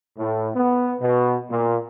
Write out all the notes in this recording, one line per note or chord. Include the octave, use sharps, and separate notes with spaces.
A2
B3
B2
A#2